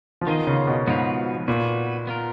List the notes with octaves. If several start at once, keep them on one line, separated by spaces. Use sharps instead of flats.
F3
D#3 B3 F4 G#4 D#5
C#3
B2
G#2 F3 B3 F#4 B4 F5
A#2 B3 F#4 B4
B3 F4 A#4